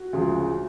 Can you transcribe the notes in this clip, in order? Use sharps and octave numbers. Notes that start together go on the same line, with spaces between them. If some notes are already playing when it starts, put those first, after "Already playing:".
Already playing: F#4
D2 C#3 F3 G#3